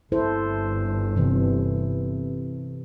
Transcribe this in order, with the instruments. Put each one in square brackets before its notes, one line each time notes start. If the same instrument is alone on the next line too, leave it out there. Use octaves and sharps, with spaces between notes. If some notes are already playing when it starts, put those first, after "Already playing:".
[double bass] G1 [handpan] E4 A4 C5
[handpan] C3 E3